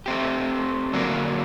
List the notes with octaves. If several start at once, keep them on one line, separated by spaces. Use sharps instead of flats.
A3 C4 G4
D3 F#3 A#3 D4